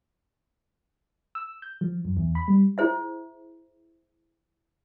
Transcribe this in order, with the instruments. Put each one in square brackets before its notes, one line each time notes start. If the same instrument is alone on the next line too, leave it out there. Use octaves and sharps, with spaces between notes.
[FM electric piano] E6
G6
F3
F#2
E2
B5
G3
[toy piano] E4 G#4 C5 E5